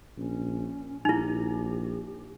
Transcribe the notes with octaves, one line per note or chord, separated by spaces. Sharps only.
A#1 C#4
A#1 D#4 E4 G4